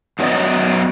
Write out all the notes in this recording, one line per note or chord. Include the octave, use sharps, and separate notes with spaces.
F#2 F#3 B3 C4 D5 D#5